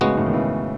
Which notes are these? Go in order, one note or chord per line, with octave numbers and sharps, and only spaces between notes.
A2 C#3 G#3 B3 F#4
A2 C#3
D#3
C#3 E3